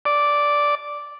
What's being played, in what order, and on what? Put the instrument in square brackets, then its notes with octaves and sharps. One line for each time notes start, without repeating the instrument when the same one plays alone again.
[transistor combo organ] D5